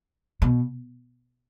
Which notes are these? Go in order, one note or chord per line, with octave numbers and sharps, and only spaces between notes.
B2